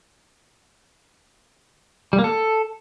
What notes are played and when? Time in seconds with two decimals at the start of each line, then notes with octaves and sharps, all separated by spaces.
2.13 G3
2.19 A#3
2.24 A4